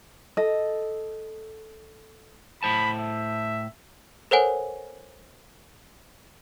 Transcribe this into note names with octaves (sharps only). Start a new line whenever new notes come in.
A4 D#5
A2 C5 A5 B5
E5
A4 A#4 C5 C#5 F#5 G#5